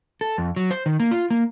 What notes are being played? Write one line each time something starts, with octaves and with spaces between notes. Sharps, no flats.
A4
F2
F#3
C5
D#3
A#3
F4
A#3